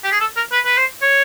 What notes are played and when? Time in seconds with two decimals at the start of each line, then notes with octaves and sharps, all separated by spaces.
0.04 G4
0.11 G#4
0.20 A4
0.36 A#4
0.52 B4
0.65 B4
0.77 C5
1.02 C#5